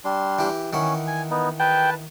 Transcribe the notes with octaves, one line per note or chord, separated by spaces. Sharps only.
G3 D4 C6
E3 G4
D#3 E3 C#4 F#5
G#5
B3 D#4
B4 G5 A5